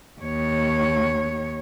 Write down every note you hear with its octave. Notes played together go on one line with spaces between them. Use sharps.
D#2 C#5